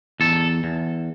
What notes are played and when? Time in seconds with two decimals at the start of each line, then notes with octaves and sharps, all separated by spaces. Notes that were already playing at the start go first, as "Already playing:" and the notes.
0.20 E2 A4
0.64 E2